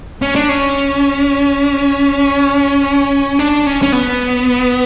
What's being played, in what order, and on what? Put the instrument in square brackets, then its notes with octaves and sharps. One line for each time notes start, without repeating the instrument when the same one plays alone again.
[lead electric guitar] C#4
D4
C#4
D4
C#4
C#4
B3